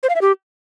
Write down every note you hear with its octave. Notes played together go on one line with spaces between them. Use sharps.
C5
F5
E5
G4